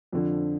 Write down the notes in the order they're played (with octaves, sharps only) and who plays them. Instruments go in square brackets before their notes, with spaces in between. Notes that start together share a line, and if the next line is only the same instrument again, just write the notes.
[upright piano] F2 D3 F3